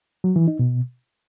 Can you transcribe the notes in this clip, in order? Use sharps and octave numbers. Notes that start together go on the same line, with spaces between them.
F#3
E3
D#4
B2